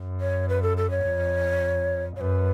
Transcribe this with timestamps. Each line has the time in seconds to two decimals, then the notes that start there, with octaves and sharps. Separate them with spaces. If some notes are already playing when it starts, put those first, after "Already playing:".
Already playing: F#2
0.21 C#5
0.49 B4
0.62 A4
0.77 A4
0.90 C#5
1.05 F2
2.16 F#2 C#5
2.21 B4